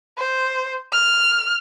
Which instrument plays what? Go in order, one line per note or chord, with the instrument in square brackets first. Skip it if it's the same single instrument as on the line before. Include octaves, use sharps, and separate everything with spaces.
[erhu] C5
F6